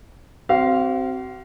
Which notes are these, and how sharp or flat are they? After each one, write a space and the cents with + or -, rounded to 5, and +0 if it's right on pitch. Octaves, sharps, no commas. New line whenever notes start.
C4 +0 F#4 +40 F5 -10